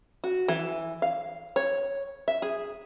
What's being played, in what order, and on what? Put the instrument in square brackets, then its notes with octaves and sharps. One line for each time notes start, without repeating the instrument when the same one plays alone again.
[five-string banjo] F#4
E3
F5
C#5
E5
G#4